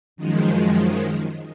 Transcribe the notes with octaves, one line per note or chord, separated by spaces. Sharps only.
F#2 D#3 F3 G#3